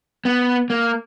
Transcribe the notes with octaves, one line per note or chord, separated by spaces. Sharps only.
B3
A#3